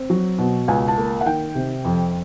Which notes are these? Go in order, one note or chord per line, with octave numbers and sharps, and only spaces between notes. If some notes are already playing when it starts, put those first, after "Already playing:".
Already playing: C4
F#3
B2
C#2 G#5
A5
A#3
F#5
D#3 G5
C3
F2